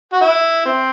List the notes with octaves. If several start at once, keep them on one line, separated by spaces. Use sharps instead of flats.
F#4
E4
C4